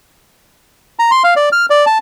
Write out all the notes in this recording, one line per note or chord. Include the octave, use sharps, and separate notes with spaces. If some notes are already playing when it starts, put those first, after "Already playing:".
A#5
C6
F5
D5
F6
D5
A5